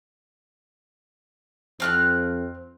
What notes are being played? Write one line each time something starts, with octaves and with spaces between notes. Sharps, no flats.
F2 C4 F6 F#6